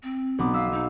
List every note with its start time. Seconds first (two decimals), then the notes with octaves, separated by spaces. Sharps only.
0.03 C4
0.38 B1 B3 D6
0.54 F5 E6 B6
0.72 D#4